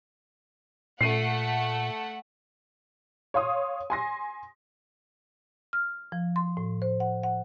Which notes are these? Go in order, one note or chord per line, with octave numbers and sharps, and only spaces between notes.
A#2 A3 F#5 C7 D#7
C#5 F5 C6 D#6
G#5 C6 A#6
F6
F3
C6
A2
C5
F#5
F#5